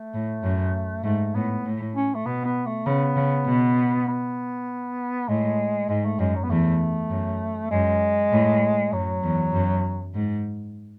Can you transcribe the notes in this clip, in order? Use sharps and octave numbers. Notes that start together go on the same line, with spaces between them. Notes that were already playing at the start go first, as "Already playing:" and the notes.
Already playing: A3
A2
F#2
G#2 A3
A2 B3
A2
C#4
A3
B2 B3
B3
A3
C#3 B3
C#3
B2
B3
A2 G#3
G#2 G#3
A3
F#2 G#3
F#3
B3
E2 A3
F#2
F#2 G#3
A2
F#2 F#3
E2
F#2
G#2